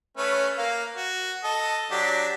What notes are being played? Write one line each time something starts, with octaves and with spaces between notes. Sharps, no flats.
A3 C#4 B4
A#3 F5
F#4
A4 D#5
F#3 D4 G4